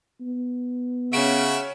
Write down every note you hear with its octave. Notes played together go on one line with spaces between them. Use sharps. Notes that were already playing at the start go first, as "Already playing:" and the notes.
B3
C#3 C#4 F#4 E5 D7